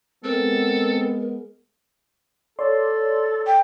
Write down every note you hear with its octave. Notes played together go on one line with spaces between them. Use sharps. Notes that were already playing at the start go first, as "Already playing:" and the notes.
G#3 B3 C4 A4 A#4
A4 C#5 D5 C6
G5